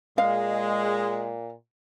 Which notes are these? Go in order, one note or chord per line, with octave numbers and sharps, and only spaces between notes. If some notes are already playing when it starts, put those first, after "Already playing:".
A#2 G#3 F5